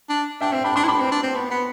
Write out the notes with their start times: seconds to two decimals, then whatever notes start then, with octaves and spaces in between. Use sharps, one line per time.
0.09 D4
0.41 D4 E5 G5
0.52 C4 E5 G5
0.64 D4 G5 B5
0.76 D4 A5 C6
0.84 E4
0.88 D4 B5 D6
1.00 C4
1.12 D4
1.23 C4
1.35 B3
1.51 B3